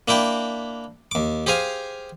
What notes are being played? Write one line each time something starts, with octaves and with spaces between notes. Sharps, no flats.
A#3 D4 E4 G5
D#2 D6
G4 G#4 C5 F5 G#5